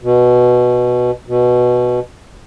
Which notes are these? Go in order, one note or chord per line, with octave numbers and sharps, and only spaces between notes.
B2
B2